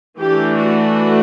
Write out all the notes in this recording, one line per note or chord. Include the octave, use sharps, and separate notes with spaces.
E3 A3 D4 G4
F#4